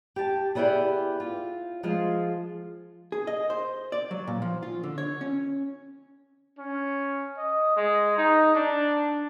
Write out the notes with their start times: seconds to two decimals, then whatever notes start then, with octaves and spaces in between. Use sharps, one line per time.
0.16 G4 A5
0.55 G3 B3 E4 G4 G#4 D5
1.20 F4
1.83 F3 G#3 F4
3.12 G#4
3.27 D#5
3.50 C5
3.92 D5
4.11 F#3
4.27 A#2
4.42 F3
4.63 F4
4.83 D3
4.98 C#5
5.21 C#4
6.59 C#4
7.38 D#5
7.77 G#3
8.18 D#4
8.55 D4